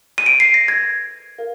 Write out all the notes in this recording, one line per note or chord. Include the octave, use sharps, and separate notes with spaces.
D#7
D7
C7
A#6
G#6
A#4 F5